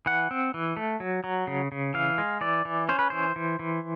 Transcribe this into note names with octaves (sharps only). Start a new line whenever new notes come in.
E3 F#5
C4
E3
A3
F#3
F#3
C#3
C#3
E3 F5
G#3
E3 D5
E3
C#4 C5
B4
E3 C5
E3
E3